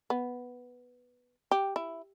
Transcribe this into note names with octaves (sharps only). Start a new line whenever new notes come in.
B3
G4
E4